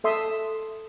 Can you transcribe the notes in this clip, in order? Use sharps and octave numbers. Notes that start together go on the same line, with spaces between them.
A4 E5 C6 D#6